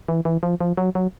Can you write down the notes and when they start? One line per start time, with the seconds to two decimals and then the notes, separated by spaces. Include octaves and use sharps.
0.08 E3
0.25 E3
0.43 F3
0.60 F3
0.77 F#3
0.95 F#3